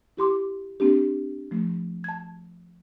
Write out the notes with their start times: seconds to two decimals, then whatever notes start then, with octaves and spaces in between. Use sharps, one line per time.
0.17 E4 G4 C6 D6
0.80 A#3 C4 D4 G4
1.51 F3 A3
2.04 A5 G#6